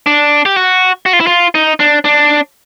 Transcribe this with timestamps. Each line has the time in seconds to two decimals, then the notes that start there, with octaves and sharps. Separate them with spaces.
0.06 D4
0.46 G4
0.56 F#4
1.06 F#4
1.13 F4
1.20 E4
1.27 F4
1.55 D#4
1.80 D4
2.05 D4